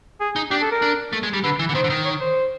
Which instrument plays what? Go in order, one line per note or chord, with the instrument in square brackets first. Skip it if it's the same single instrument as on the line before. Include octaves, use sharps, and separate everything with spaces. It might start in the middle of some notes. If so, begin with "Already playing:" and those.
[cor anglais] G#4
[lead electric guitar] D#4
[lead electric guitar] D4 [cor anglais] G4
[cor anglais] A4
A#4
[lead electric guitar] D4
A3
G#3
G3
[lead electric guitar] D3 [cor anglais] B4
[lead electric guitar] E3
D3
[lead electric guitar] D#3 [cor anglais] C5
[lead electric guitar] D3
D#3
[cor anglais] C#5
C5